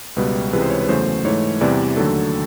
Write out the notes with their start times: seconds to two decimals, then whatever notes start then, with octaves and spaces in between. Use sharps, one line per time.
0.16 C#2 B2 G3 B4
0.53 C#2 C3 E3 G#3 B4
0.62 C5
0.70 C#5
0.80 B4
0.89 E2 C#3 F#3 A3 C5
1.25 G#2 E3 A3 C#5
1.61 E2 C3 E3 G3 D5
1.97 D#2 D3 F#3 A3 A4